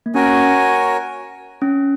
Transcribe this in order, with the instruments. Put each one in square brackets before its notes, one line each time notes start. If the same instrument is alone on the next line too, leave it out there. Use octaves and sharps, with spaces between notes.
[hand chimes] A#3
[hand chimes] C#4 [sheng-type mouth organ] F#4 A#4 C#5 G#5
[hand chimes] C#4